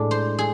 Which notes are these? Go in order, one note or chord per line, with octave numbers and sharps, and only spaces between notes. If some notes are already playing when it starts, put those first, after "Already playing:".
Already playing: A2 G#3 D4 D5
C5
G#4